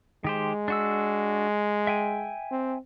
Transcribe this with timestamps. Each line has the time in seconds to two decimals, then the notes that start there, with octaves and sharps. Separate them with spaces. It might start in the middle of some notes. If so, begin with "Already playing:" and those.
0.24 D#3 G#3 G4 C5
0.68 D4 F#4 E6
1.87 E5 G5 G#5
2.51 C4